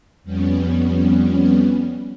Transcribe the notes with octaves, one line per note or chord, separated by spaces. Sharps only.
F2 G3 B3 C#4